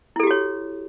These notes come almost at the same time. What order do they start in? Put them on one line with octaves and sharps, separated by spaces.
E4 A4 G4 F#4 C#5